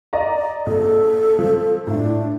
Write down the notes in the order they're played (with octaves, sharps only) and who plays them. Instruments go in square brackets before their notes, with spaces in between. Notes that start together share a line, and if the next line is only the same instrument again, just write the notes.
[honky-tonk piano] D5 D#5 A#5
[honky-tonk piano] A#1 [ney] A4
[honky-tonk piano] F3
[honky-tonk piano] A2 E4 [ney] D4